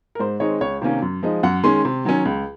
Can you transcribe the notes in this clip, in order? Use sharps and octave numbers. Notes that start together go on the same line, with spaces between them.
A#4
G#2 C5
D#3 G#3 C4 D#4 C#5
C#2 C#5
C3 D#3 A#3 C#4
F#2
F3 G#3 D#4
F#2 F#5
D#3 G#3 C#4 C6
C3
D#3 F#3 C#4
C#2